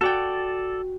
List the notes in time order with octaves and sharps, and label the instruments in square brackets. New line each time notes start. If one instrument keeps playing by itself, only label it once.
[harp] F#4 G5 [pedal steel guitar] A4 D5